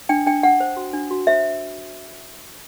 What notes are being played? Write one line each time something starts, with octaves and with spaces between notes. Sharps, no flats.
D4 G5
D4 G5
D4 F#5
C5
F#4
D4
F#4
C5 E5